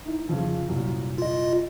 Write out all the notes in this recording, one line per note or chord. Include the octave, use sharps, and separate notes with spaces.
D#4 E4
F2 C#3 F3
C2 F#2 A#2
F4 D#5